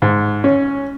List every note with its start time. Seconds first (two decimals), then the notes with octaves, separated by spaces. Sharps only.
0.02 G#2
0.44 C#4